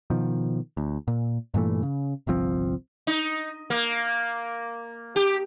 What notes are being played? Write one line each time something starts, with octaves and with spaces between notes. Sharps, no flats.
B2 D#3 F3
D2
A#2
G2 A#2 E3 A3
C#3
G1 C2 F3 C4
D#4
A#3
G4